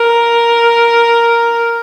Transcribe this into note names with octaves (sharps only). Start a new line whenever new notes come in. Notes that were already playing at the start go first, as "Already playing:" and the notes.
Already playing: A#4